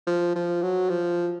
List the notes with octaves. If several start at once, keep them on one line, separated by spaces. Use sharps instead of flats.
F3
F3
F#3
F3